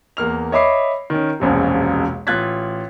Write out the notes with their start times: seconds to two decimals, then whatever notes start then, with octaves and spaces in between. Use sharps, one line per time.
0.17 E2 A#3 F6 F7
0.52 C#5 D#5 E5 B5 D6 C7
1.10 D#3 C#4
1.40 E1 A#1 F#2 C3
2.27 A1 F4 F#6 G#6 A6 B6